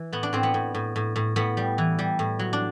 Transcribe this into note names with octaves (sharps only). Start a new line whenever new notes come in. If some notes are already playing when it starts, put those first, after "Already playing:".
Already playing: E3
A2 B3
D4
A2 C4
B3
A2
A2
A2
A2
A2 B3
G3
E3
G3
A2
F#3
D4